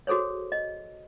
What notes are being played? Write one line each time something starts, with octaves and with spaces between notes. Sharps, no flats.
F#4 G#4 A4 C5 C#5
D#5